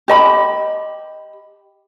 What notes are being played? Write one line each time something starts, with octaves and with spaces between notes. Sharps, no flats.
G4 D#5 B5